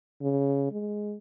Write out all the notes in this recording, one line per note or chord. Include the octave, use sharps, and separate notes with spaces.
C#3
G#3